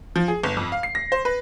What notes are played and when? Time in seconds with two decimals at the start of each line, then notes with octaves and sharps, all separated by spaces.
0.16 F3
0.28 G#4
0.44 G1
0.57 F2
0.72 F5
0.83 C7
0.95 A#6
1.12 C5
1.25 B4